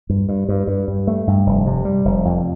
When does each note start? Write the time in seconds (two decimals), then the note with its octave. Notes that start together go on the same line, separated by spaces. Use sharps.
0.09 G2
0.29 G2
0.49 G2
0.67 G2
0.88 G2
1.07 A3
1.27 G2
1.46 F1
1.66 C3
1.85 G3
2.05 F1
2.25 F2